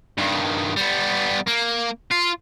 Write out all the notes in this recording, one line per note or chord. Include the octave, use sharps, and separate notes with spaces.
G2 D#3
G3 B3
A#3
F4